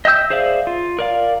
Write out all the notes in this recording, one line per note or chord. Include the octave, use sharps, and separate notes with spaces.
D#5 E5 G5 E6 G6
G#4 C5 D5 E5 F5
F4
A#4 D5 F5